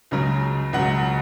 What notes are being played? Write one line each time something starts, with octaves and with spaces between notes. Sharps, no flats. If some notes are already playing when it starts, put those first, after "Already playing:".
C#2 C#3 F#3
C#2 C#3 F#3 F#5